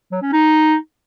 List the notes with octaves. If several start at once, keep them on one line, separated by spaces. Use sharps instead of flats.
F#3
C#4
D#4